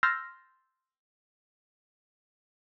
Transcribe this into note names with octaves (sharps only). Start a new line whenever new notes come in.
C6 E6 F6 G6 A6 A#6